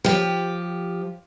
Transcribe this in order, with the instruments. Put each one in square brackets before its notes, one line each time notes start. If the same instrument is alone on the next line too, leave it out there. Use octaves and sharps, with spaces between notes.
[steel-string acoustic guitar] F3 G4